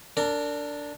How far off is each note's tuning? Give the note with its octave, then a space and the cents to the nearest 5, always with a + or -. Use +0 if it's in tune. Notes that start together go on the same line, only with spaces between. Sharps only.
D4 -10 A#4 -35